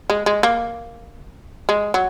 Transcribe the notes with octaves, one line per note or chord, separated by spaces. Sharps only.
G#3
G#3
A#3
G#3
F#3